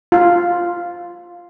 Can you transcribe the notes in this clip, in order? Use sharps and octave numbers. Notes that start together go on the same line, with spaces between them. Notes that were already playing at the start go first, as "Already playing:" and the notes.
F4